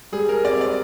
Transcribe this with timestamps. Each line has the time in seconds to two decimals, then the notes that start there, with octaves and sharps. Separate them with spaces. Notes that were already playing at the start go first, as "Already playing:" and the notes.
0.12 G3 G#4
0.29 A#4
0.45 C4 D5
0.61 D5